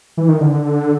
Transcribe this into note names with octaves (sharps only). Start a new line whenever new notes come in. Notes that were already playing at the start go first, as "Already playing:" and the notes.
E3
D#3
D3